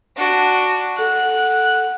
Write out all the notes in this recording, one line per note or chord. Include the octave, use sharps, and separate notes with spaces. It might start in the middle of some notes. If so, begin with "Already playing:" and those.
D4 F#4
A4 F#5 F#6